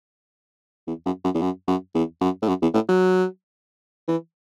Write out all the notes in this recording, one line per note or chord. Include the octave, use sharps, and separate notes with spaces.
E2
F#2
F#2
E2
F#2
F#2
E2
F#2
A2
F#2
E2
A2
F#3
E3